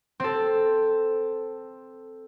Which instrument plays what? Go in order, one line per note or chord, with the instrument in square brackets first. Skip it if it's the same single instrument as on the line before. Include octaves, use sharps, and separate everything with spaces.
[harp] C4 A4